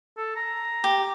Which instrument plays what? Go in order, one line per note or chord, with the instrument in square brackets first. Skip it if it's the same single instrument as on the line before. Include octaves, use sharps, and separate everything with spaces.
[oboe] A4
A#5
[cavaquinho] G4